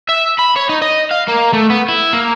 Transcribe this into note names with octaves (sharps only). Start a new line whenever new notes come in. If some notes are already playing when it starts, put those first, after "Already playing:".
E5
B5
C#5
D#4
D#5
F5
A#3
A3
B3
E4
A#3